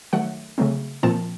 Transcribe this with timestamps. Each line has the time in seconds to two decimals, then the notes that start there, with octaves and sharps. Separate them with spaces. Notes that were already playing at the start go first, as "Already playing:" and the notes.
0.13 D#3 F#3 A3 F#5
0.58 C#3 F#3 A3 C4
1.03 A#2 F3 C4 A5